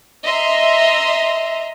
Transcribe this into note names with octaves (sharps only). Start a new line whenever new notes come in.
D#5 E5 A#5 C6